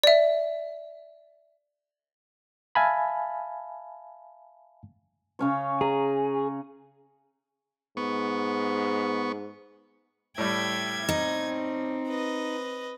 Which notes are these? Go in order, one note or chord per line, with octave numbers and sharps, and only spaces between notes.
D5 E5
E5 F5 G#5 A5 B5
C#3 C#4 C#5
G#4 A#5
G#2 B3 C#6
A2 G3 E5 G5 G#6
C4 D#4
B4 D#5